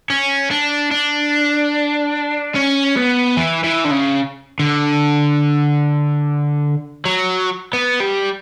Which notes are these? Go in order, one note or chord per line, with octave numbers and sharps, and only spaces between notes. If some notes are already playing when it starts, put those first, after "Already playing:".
C#4
D4
D4
C#4
B3
E3
E3
D3
C#3
D3
F#3
B3
G3